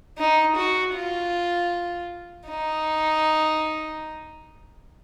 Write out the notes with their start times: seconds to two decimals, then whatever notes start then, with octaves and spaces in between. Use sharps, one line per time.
0.18 D#4
0.56 F#4
0.95 F4
2.49 D#4